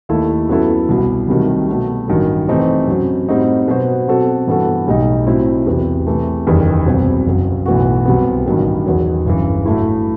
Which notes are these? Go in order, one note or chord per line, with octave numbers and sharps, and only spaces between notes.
D#2 D#3 A3 E4 A4
F#2 F#3 B3 E4 A4
C2 B2 F#3
C2 C3 D#3 F#3 A3
B2 F#3 A3
A1 G2 D#3 F#3
C3 E3 A3 C4 D#4
F#2 F#3 C4
A2 G3 C4 D#4 F#4
B2 F#3 B3 F#4 C5
B2 F#3 C4 F#4 A4
G2 E3 B3 F#4 A4
B1 A2 G3 D#4
A2 F#3 C4 E4
E2 C3 F#3 B3
C3 E3 A3
F#1 E2 D#3 G3
C2 B2 F#3 C4
F#1 F#2 F#3
B1 A2 E3 B3 F#4
C2 C3 F#3 B3
A1 G2 D#3 F#3
E2 D#3 F#3
G1 F#2 E3
A2 F#3 A3 E4